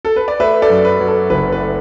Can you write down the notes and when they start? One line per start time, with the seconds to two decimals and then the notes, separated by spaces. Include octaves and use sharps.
0.05 A4
0.16 B4
0.28 D5
0.40 A3 B4 E5
0.62 A4 D5
0.70 F#2
0.85 B4
1.00 F#3
1.07 A4
1.30 F#1 B4
1.52 B4
1.60 A3